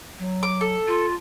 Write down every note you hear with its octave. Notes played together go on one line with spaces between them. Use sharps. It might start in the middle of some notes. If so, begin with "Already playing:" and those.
F#3
D6
A4
F4